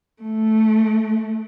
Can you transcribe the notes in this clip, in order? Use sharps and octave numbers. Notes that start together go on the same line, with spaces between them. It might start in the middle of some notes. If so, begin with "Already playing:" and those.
A3